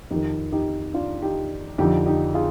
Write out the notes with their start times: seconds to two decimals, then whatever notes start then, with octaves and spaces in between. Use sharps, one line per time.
0.10 F2 D#3 D#4 G4
0.52 D#4 G4
0.94 D4 F4
1.22 D#4 G4
1.78 F2 D3 F3 D#4 G4
2.06 D#4 G4
2.34 F4 G#4